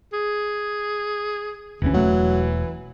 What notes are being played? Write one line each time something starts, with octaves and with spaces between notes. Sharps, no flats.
G#4
F1 D2 E3 C#4
E1 F#3 A3